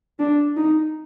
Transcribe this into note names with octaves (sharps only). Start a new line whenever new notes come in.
D4
D#4